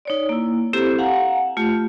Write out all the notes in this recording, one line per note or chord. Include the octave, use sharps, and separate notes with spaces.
D#4 C#5 D5
A#3 E4
C4 E4 G4 A4 C5 A#5
F5 F#5 G#5 A#5
A3 F4 G4